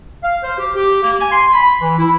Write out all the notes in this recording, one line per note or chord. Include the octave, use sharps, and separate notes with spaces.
F5
C5
G4
G4
A#3
G#5
C6
B5
E3
E4